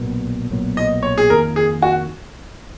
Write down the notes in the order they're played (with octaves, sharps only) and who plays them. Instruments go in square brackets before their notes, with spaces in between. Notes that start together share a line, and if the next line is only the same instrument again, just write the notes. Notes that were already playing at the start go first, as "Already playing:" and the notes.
Already playing: [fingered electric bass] B1 A#2 F#3 B3
B1 A#2 F#3 B3
[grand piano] D#5
C#5
G#4
[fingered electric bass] F2 D#3 A#3 [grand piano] A#4
[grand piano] G#4
F#4